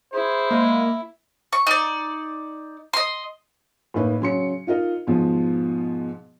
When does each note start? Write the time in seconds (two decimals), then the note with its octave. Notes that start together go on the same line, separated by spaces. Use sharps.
0.14 E4 G#4 C5
0.50 G#3 A#3
1.53 C#6
1.67 D#4 D5
2.93 D#5 C6
3.94 A2 A#3 D#4 B4
4.20 C#3 F#3 C6 C#7
4.67 D#4 F4 A#4 D#5
5.07 G#2 B2 F3